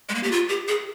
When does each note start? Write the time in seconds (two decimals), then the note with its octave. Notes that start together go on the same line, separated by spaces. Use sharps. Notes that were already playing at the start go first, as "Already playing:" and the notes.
0.09 G#3
0.15 A#3
0.23 G4
0.31 F4
0.49 G4
0.68 G#4